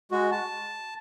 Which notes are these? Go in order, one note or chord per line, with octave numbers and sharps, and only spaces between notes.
G#3 F#4
A5